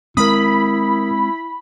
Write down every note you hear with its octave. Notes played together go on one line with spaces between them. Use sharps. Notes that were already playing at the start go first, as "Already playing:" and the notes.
G#3 C4 E4 A#4 B5 D#6